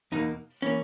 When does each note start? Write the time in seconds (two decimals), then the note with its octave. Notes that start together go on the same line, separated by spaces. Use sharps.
0.12 E2 B2 A#3 D#4
0.62 E3 A#3 C#4